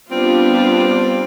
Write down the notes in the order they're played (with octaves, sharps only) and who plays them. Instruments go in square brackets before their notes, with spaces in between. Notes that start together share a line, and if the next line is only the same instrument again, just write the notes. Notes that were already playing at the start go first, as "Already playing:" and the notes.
[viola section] G3 B3 D4 F4 [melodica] C4